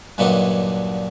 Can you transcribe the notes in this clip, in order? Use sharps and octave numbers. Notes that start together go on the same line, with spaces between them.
G2 A#2 D3 F#3 D#4